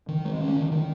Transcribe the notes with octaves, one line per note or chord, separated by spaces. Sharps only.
D#3
G#3
C#4
D#3
D#3